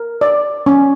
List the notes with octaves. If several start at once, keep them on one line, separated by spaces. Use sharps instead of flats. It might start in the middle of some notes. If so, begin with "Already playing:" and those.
Already playing: A#4
D5
C#4